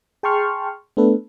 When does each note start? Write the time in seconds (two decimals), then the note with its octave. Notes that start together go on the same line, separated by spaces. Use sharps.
0.23 G#4 G5 A5 C6 C#6 F6
0.97 A3 B3 D4 A4 B4